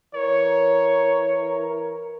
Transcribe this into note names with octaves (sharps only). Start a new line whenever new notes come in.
E3 A#4 C#5